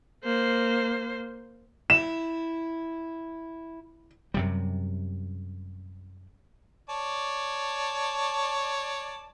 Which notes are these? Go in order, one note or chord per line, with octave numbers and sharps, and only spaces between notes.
A#3 C5
E4 E7
F#2 C3 G3
C#5 D5 A5